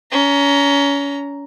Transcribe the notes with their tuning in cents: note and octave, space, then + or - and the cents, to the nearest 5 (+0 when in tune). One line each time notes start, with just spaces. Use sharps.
C#4 +30 A#5 +0